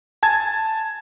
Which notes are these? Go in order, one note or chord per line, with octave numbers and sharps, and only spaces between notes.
G#5 A5 G#6